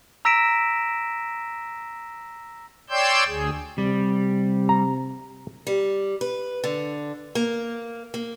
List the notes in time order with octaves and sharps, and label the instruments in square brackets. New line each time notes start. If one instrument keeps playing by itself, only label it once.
[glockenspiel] A#5 E6 A#6 B6 D7 E7
[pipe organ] C#5 D5 G5 C6 E6 G6
D2 G#4
[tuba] C3 [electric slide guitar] G3
[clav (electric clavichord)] A#5
[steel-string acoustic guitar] G3
B4
D3
A#3
A#3